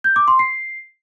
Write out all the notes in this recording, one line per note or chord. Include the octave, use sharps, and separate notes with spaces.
G6
D6
C6
C7